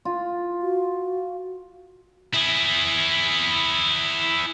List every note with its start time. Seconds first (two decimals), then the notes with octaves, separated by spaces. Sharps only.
0.05 F4
0.62 F#4
2.34 E4 G#4